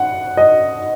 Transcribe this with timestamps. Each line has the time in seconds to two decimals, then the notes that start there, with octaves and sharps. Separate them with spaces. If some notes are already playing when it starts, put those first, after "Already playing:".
Already playing: F#5
0.37 D#5